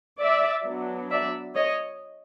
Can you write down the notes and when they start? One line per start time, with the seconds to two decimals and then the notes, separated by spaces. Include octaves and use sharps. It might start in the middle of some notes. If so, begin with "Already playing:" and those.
0.21 D5 E5
0.65 F#3 B3 D4
1.10 D5 E5
1.55 C#5 D#5